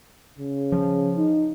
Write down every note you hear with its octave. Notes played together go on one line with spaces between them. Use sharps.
C#3
F3
D#4